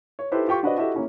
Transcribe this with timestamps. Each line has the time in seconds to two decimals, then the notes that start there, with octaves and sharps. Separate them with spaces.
0.19 C#5
0.32 D#4 E4 G4 A4 B4 C5
0.48 F4 G4 G5 C#6
0.63 D4 F#4 B4 C5 D5 D#5
0.78 E4 F#4 G4 A4 D#5 E5
0.94 A#3 C#4 E4